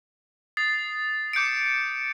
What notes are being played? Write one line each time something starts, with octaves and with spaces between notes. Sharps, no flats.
D#6 A6 C7
D6 G6 C#7 D7